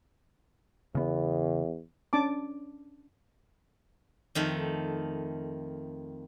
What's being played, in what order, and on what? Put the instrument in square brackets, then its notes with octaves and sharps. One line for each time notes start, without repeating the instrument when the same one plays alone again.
[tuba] E2 [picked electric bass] C#3 B3
[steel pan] C#4 D4 A5 D6
[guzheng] F2 D#3 A3